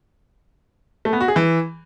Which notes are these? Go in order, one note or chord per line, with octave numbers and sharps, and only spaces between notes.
A3
B3
F#4
G#4
E3